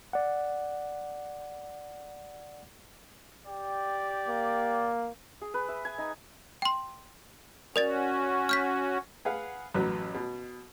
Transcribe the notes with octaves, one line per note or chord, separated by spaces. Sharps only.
D5 F#5
G4 D5 G5
A#3
G#4
B4
E5
G#5
D#4
G5 C6
C#4 F#4 A#4 D5 A6
F6 G6 B6
G#4 B4 F5 F#5
A1 F#2 F#3 B4 F#6
B2